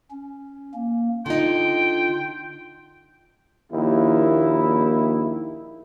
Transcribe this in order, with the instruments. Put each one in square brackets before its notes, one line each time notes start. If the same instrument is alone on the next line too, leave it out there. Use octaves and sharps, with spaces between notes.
[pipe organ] C#4
A#3
[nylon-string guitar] D3 D#4 [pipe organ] F4 [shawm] G5
[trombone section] A#1 D#2 D#4 E4